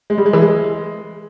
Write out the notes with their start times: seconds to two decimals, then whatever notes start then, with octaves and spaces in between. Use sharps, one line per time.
0.10 G#3
0.18 G3
0.26 G#3
0.33 E3
0.41 G#3